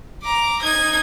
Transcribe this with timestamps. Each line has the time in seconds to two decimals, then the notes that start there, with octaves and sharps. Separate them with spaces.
0.23 A#5 D6
0.62 D#4 G#6